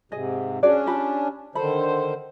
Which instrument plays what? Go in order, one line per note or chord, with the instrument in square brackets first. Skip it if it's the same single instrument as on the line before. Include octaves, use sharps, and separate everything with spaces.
[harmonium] G#2 C3 [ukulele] G#4 D#5
[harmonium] C#4 D4 [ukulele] F#4 G#4 D5
[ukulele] F4 G4 B5
[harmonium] D3 D#3 C5 [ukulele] A4 B5